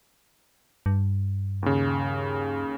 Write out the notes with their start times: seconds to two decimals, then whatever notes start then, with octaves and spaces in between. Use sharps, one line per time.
0.86 G2
1.63 D#2 C#3